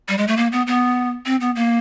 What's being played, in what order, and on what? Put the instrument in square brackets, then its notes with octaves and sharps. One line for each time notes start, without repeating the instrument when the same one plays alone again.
[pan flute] G3
G#3
A3
A#3
B3
B3
C4
B3
A#3